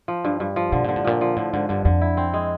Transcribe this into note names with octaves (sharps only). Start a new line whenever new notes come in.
F3
G2
G2
F3
B2 D3
A#2 D3
A2
A#2 F3
F3
A2 D3
G#2 D3
G2 D3
F2 D3
E4
C4
G#3